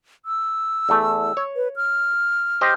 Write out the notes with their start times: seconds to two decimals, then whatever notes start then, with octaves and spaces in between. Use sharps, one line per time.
0.26 E6
0.89 E2 A3
1.37 C#5
1.56 B4
1.76 F6
2.61 G4 C5 D#5